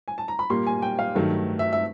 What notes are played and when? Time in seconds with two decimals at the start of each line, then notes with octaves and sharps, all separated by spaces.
0.08 G#5
0.18 A5
0.28 A#5
0.39 B5
0.50 A#2 G3 A#3 C6
0.67 G#5
0.82 G5
0.99 F5
1.15 G2 D#3 F#3 A3
1.59 E5
1.73 E5